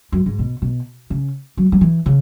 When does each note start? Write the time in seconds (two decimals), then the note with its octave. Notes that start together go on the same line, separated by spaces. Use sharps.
0.12 F#2
0.26 G#2
0.39 B2
0.62 B2
1.10 C#3
1.57 F#3
1.72 F#3
1.81 E3
2.06 C#3